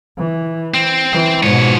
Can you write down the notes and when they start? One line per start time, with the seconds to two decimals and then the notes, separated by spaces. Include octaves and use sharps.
0.18 E3
0.74 C4
1.13 E3
1.43 G#2 B2 F3 C#5